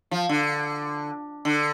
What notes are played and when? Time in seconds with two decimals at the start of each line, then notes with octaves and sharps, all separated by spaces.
0.11 F3
0.29 D3
1.45 D3